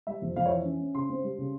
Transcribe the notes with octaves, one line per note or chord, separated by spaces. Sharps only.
G3 E5
F2
F2 F5
C#5
E3 E5
C#4
C#4
C#3 C6
C4
G3
C#3